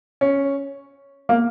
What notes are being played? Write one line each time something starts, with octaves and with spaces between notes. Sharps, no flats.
C#4
A#3